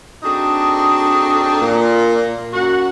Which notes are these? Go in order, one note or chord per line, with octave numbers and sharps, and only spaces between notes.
C4 D4 D#4 F#4 G#4 A4
A#2
F#2 F#4 F#5